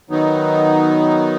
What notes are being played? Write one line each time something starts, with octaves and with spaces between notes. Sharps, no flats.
D#3 F#3 B3 D#4